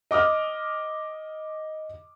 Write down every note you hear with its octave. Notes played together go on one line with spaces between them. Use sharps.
D#5 D6 D#6 F6